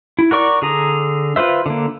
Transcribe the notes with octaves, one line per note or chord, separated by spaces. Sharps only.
E4
F#4 A#4 D5 C#6
D3 G#4 A#5
F4 B4 C5 E5
D3 A#3